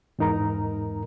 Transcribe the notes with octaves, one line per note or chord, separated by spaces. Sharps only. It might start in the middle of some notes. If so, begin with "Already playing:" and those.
E2 G#2 D#4 A#4 A#5